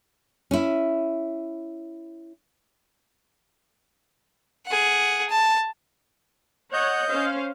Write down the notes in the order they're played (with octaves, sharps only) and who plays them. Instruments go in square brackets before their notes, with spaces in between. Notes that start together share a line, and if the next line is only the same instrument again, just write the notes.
[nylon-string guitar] C#4 E4
[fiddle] G#4 F#5
A5
[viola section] C#5 F#5 [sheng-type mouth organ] D#5 G6
[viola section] C#4 C5 F5